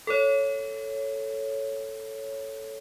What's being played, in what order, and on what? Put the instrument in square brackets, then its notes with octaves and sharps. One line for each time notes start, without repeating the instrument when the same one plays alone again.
[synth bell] A4 C#5